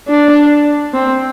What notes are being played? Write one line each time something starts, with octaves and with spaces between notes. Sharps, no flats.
D4
C4